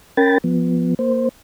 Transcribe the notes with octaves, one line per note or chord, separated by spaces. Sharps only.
C#4 A#4 G5 B5 A6
F3 B3
A#3 C5